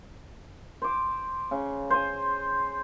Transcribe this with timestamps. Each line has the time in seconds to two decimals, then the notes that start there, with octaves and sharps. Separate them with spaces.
0.82 C5 D6
1.51 C#3
1.90 C5 G#5